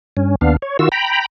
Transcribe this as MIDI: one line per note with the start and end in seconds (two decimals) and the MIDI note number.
0.17 0.35 43
0.17 0.35 61
0.41 0.56 39
0.41 0.56 59
0.41 0.56 62
0.41 0.56 77
0.62 0.77 73
0.79 0.89 51
0.79 0.89 65
0.79 0.89 66
0.79 0.89 88
0.92 1.26 79
0.92 1.26 82
0.92 1.26 83